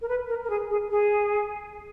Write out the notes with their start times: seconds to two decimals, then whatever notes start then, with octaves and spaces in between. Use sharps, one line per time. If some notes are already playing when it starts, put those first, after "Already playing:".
0.02 A#4
0.09 B4
0.28 A#4
0.44 A#4
0.50 G#4
0.70 G#4
0.91 G#4